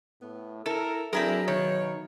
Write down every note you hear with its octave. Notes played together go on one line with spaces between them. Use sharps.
A2 B3
E4 A4 A#4
F#3 C4 D4 E4 G#4 A#4
B2 D#3 C#5